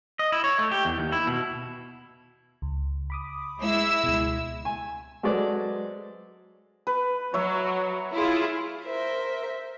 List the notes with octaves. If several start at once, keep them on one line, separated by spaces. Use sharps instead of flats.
D#5
E4
C#5
A3
G4
E2
D#2
E4
B2
C#2
B5 D6 D#6
G#3 E4 E6
C#2 B2
G#5
F#3 G#3 A4 B4 C5 D5
B4
F#3 C#5 E5
E4 F4 G#4
A#4 C5 E5